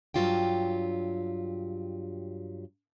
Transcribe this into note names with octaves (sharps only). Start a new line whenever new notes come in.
G2 F3 F#3 F4 G4 G5